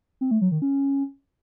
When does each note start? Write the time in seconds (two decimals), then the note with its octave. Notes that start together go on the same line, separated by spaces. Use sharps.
0.21 C4
0.31 A3
0.41 F#3
0.52 D#3
0.62 C#4